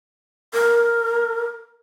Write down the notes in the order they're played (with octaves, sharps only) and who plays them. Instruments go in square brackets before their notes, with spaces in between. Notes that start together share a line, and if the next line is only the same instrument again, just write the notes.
[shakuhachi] A#4